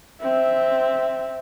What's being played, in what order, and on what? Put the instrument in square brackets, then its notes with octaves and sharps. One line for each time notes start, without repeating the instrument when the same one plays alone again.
[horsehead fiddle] C4 E5